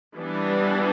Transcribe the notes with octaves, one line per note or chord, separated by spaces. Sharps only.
E3 G3 B3 D4